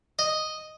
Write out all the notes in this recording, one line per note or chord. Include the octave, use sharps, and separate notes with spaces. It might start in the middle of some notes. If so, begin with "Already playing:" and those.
D#5